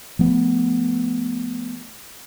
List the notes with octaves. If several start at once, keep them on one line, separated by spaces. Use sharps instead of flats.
F3 A3 B3